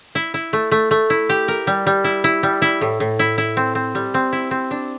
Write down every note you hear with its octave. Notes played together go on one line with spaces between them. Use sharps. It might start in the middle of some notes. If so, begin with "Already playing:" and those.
E4
E4
A3
A3
A3
E4
G4
A#4
G3
G3
E4
E4
G3
E4
A2
A2
E4
E4
C4
C4
G3
C4
E4
C4
D4